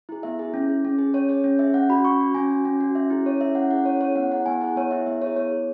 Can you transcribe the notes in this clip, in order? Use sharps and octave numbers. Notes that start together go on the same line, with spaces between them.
E4 G#4
B3 E5
E4 G#4
C#4
G#4
C#4
G#4
C#4 C#5
G#4 C#5
C#4
G#4 E5
C#4 F#5
F#4 B5
C#4 C#6
F#4
C#4 G#5
F#4
C#4
F#4
C#4 E5
E4 G#4
C#4 C#5
E4 G#4 E5
C#4 F#5
E4 G#4 F#5
C#4 C#5
E4 G#4 C#5
B3 F#5
E4 G#4 F#5
B3 G#5
E4 G#4 F#5
B3 C#5
E4 G#4 E5
B3 E5
E4 G#4 C#5
B3 C#5
G#4